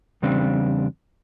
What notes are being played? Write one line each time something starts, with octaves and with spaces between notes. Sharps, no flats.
E2 C#3 G3 C4 D4